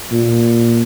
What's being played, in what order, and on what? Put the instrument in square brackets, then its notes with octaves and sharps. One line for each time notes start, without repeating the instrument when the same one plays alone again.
[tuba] A#2